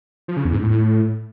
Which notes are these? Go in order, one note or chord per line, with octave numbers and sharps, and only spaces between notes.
F3
C#3
E2
G#2
A2